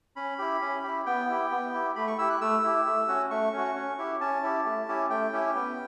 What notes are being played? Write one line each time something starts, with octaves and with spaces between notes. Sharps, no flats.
C#4 B5
E4 G4
C#4
E4 G4
B3 G5
E4 G4
B3
E4 G4
A3 B5
C#6
E4 G4 E6
F#6
A3 E6
E4 G4
A3
C#4 F#4
A3 C#6
C#4 F#4
C#4
E4 G4
C#4 A5
E4 G4
A3
C#4 E4 G4
A3 G5
C#4 E4 G4
B3